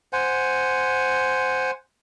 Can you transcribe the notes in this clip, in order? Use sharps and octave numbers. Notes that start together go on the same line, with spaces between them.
C5 F#5 G#5